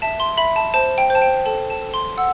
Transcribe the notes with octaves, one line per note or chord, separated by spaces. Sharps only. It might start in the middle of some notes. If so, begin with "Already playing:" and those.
E5 A5
C6
E5 B5
A5
C5 A5
G5
C5
A5
G5
A4 A5
A5
A4
C6
F#5 E6